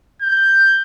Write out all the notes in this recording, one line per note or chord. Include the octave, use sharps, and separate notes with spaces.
G6